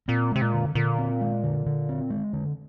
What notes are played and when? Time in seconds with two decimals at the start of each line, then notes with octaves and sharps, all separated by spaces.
0.08 A#2 C4
0.31 C3 G#3
0.42 A#2
0.53 D3
0.75 A#2 D3
0.98 C4
1.21 G#3
1.43 D3
1.66 D3
1.89 C4
2.10 G#3
2.33 D3